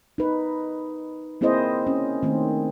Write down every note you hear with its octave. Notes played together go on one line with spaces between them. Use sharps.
D#4 B4
A#3 C4 E4 G#4 C5 D#5
C#4
D#3 A3 C4